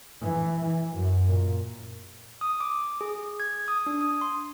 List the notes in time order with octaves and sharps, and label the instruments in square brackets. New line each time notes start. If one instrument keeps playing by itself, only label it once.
[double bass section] E3
E3
F#2
A#2
[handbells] D#6
D6
G#4
G#6
D#6
D4
D#6
C6